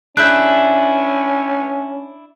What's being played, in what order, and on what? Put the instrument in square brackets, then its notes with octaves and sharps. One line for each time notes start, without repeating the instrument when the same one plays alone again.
[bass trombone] C#4 [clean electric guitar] D4 E4 [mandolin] G#4 E5 [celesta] F#6 G6